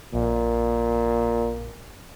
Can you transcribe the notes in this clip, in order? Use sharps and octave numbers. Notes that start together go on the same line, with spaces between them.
A#1 A#2